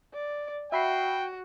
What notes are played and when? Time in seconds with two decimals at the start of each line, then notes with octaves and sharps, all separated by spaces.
0.14 D5
0.72 F#4 E5 G5 B5 C7